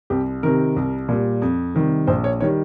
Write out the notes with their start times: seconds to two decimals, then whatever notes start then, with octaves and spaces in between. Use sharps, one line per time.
0.10 C2 G4
0.43 C3 D#3 A#4
0.76 C2
1.09 A#2 G3
1.42 F2
1.75 C3 D#3 G3
2.07 A#1 C5
2.24 C#5
2.41 D#3 G3 C#5